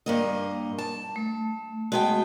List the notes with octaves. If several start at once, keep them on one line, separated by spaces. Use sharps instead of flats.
G2 A#3 D#5
A5
A3
G#3 B3 F#4 G5 A5